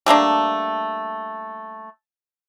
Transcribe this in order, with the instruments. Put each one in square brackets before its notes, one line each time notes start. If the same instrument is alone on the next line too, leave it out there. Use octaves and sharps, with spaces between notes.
[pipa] G3 A3 A#3 D4